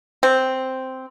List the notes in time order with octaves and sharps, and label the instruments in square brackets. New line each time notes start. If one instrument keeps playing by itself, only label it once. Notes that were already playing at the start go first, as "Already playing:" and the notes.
[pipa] C4